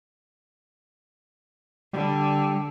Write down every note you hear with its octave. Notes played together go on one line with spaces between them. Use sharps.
D3 G3